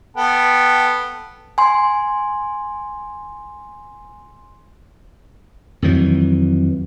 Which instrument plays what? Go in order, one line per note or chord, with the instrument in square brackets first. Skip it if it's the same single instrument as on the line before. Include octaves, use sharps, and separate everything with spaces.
[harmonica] B3 A4 G5
[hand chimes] G#5 C6
[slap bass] F2 D#3 E3 F#3